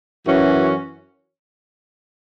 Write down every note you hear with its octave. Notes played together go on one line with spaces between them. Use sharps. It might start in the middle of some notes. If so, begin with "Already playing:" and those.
F#2 E3 C#4 F#4